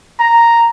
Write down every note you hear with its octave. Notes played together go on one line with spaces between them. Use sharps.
A#5